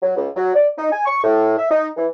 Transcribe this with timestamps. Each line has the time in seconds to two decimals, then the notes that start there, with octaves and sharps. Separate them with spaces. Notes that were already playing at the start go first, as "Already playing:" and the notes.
0.02 F#3
0.16 C#2
0.36 F#3
0.54 D5
0.77 D#4
0.92 G#5
1.06 C#6
1.23 A2
1.58 E5
1.71 D#4
1.97 E3